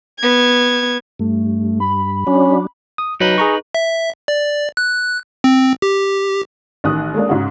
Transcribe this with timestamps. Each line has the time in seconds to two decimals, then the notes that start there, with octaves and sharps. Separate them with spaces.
0.19 B3 G#6
1.19 G2 A3
1.80 B5
2.27 F#3 C#4 D4
2.98 D#6
3.20 F#3 D#4 B4
3.38 G#4 A#5 C#6
3.75 E5
4.28 D5
4.77 F#6
5.44 C4
5.82 G4
6.84 A1 D#3 D#6 F#6
7.14 G#3 A#3 D4
7.29 G#2 C#3 F#4